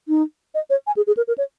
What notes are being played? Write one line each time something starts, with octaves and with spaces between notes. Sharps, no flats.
D#4
D#5
C#5
G#5
G#4
G#4
A#4
A#4
C#5